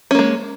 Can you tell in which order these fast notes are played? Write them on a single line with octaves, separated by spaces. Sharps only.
C#4 A#3 G#3